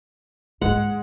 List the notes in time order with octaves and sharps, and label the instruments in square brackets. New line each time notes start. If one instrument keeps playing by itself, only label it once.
[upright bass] D#2 G#2 [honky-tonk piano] G#3 [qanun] F#5